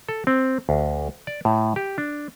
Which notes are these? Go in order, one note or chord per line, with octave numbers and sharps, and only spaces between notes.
A4
C4
D2
D5
A2
G4
D4